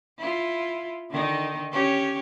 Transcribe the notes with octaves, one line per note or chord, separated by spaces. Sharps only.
E4 F4
D3 D#3 D#4
C#4 G4 C#5